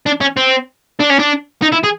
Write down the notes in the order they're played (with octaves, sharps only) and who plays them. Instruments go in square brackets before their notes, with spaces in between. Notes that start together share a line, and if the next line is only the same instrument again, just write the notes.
[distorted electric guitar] D4
C#4
C4
D4
C#4
D4
D#4
E4
G#4